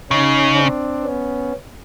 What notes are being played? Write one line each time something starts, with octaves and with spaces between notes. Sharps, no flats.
C#3 C#4 D#4
C4 D4
B3 C#4